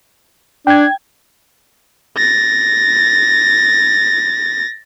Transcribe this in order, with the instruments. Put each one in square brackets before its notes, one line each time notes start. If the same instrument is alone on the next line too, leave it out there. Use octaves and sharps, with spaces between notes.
[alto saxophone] D4 [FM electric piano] G5 G#6
[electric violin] A6 A#6